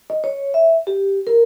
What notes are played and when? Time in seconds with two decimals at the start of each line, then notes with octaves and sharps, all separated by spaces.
0.10 D#5
0.24 C#5
0.54 E5
0.87 G4
1.27 A#4